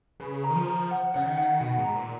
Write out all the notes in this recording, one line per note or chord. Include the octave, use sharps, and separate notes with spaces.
C#3 B4
A#5
D#3
F3
A#5
F#5
C#3 F#5
D#3
F#5
B2 F#5
G#2
A#5
A#2